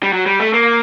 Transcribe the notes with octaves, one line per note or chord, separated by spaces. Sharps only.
G3
F#3
G3
A3
A#3